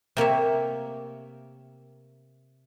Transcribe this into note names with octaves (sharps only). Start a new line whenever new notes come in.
C3 A#3 C#5 E5